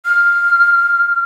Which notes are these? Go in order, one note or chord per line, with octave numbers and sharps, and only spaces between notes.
F6